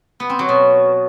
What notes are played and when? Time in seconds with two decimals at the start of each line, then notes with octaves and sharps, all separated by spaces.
0.20 B3
0.30 C4
0.39 F#3
0.49 B2